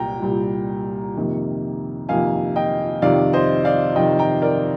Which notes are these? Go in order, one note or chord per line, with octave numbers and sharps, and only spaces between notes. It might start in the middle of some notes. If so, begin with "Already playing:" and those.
Already playing: C2 A#2 G3 G5 A#5
C2 A#2 G3
F2 C3 D#3 A#3
F2 C3 D#3 A#3 F5 G#5
D#5 G5
F2 C3 D#3 D5 F5
C5 D#5
D5 F5
F2 C3 D#3 D#5 G5
G5 A#5
A#4 D5